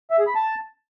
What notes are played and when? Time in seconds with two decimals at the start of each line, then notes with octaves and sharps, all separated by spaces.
0.10 E5
0.19 G#4
0.27 B5
0.35 A5